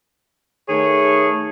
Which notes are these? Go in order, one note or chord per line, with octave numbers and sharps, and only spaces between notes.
D#3 A3 G#4 C#5